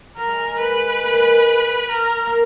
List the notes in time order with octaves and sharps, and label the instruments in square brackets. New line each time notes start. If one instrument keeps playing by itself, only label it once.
[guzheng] F#3 [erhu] A#4
[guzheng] G#3
G#3
A#3
[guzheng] G#3 [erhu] B4
[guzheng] A#3
G#3
A#3
[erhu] A#4
[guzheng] A#3